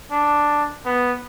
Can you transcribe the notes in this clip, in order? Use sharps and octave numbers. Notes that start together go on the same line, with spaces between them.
D4
B3